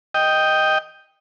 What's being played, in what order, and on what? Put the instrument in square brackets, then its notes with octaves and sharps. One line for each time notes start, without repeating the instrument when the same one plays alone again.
[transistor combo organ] D#5 G5